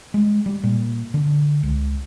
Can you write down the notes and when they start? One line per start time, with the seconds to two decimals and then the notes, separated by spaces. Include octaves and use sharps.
0.14 G#3
0.46 G3
0.63 A#2
1.14 D3
1.63 C#2